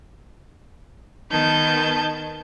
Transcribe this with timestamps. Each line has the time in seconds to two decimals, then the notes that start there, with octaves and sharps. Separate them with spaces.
1.30 D#3 B3 A5 G6 G#6